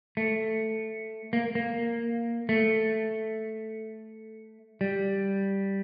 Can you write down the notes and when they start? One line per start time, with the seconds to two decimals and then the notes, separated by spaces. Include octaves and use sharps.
0.17 A3
1.33 A#3
1.55 A#3
2.49 A3
4.81 G3